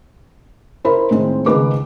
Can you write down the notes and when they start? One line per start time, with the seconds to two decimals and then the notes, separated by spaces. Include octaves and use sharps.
0.85 E4 A#4 C5 B5
1.11 A2 D#3 G#3 C4
1.46 C#2 D#3 B4 D6